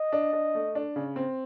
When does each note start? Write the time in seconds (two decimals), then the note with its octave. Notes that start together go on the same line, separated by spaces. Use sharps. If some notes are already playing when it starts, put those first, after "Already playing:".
Already playing: D#5
0.13 D4
0.33 D4
0.55 A3
0.75 D4
0.96 C#3
1.16 C4